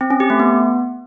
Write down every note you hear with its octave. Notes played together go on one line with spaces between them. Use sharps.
C4
C#4
G4
A3
B3